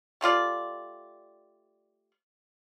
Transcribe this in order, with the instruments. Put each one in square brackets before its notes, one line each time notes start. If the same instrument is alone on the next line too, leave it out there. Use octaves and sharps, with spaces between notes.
[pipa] G3 A3 F4 D5